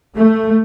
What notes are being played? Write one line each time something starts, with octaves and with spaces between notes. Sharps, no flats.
A3